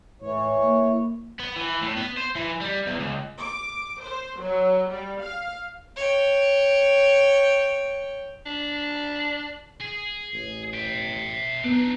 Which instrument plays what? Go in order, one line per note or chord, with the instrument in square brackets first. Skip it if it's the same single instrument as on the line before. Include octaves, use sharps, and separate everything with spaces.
[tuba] A2 [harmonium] E3 C#5
[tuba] A#3
[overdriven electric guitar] B3
E3
A2
B3
C5
E3
G3
E2
C#2
[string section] D6
C5
F#3
G3
F5
[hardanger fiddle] C#5 G5
[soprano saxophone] D4
[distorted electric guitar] G#4
[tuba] A1
[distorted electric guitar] E5 G5
[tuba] B3 [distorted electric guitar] D4 D#4